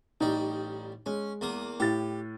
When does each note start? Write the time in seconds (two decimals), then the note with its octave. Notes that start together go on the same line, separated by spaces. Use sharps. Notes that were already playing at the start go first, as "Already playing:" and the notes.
0.21 A1 G3 D#4 G5
1.06 G#3 C#4
1.41 E2 A#3 D#6
1.80 A2 G4 A6